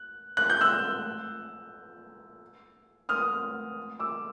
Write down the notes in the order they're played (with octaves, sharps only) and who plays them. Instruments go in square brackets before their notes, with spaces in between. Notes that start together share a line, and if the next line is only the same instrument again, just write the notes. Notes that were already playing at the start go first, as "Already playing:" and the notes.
Already playing: [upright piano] F#6
F#6
G6
E6 F#6
D#6 F6
D6 E6